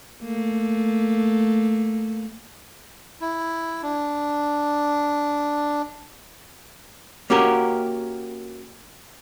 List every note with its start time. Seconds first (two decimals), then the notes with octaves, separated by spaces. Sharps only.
0.23 A3 A#3
3.21 E4
3.83 D4
7.30 A#3 C#4 F#4 G4 A#4